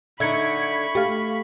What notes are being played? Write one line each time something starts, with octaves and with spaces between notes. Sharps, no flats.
D3 D#4 E5 B5 C#6 G#6 C#7
A3 G4 F5